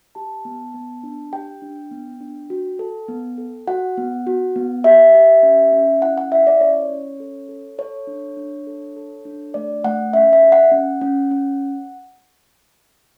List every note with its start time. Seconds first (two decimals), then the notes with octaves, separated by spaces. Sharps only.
0.15 G4 A5
0.45 B3
0.74 B3
1.03 D4
1.33 G4 G5
1.62 D4
1.91 B3
2.20 D4
2.50 F#4
2.79 A4
3.08 B3
3.38 A4
3.67 F#4 F#5
3.97 B3
4.27 F#4
4.56 B3
4.84 G4 E5
5.15 G4
5.43 C#4
5.73 C#4
6.02 E4 F#5
6.18 F#5
6.32 E4 E5
6.47 D5
6.61 C#4 C#5
6.90 C#4
7.20 A4
7.49 A4
7.78 A4 C#5
8.07 D4
8.37 D4
8.67 A4
8.96 A4
9.25 D4
9.54 A3 D5
9.84 A3 F#5
10.13 C#4 E5
10.33 E5
10.42 G4
10.52 F#5
10.72 C#4
11.01 C#4
11.31 C#4